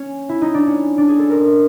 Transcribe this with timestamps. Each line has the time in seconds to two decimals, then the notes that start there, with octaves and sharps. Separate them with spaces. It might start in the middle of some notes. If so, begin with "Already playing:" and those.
Already playing: C#4
0.29 E4
0.41 D#4
0.54 D4
0.67 C#4
0.98 D4
1.09 G#4
1.19 A4
1.29 A#4